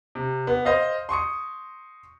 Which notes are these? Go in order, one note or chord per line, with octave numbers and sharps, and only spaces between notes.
C3
B3
C5 D#5 F5
C6 C#6 D#6 C#7